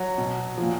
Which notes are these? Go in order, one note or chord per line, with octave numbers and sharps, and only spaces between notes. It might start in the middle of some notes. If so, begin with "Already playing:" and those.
Already playing: F#3
B2
A#2 F3